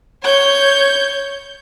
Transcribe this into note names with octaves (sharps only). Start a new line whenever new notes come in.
C#5 G6